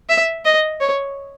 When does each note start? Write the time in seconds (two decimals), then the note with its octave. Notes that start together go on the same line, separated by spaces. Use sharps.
0.09 E5
0.45 D#5
0.80 C#5